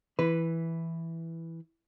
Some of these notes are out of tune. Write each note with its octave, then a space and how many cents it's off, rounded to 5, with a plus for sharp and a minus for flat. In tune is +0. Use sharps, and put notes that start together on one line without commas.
E3 +0 B4 +0 C6 -40